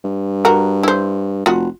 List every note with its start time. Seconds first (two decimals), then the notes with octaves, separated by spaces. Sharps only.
0.04 G2
0.45 F#4 A#4
0.83 E4 C5
1.46 F1 F4 F#4